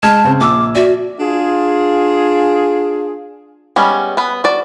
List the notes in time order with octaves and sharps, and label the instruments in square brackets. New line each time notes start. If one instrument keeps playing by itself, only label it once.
[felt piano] G#3 F6 G#6 [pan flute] A5
[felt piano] C#3 C4
[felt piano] A#1 E6 [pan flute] D6
[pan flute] F#4 [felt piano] D5 E5
[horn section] D4 F4 G#4
[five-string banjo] G3 G#3 B3 C#4
B3 B4
F#4 D5